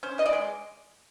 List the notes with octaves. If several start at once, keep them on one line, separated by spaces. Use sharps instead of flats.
C#4 C5
E3 D#5
D5
G#3